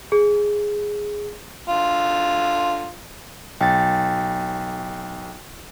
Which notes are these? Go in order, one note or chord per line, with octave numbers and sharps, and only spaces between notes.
G#4
D3 F4
B1 G5 A6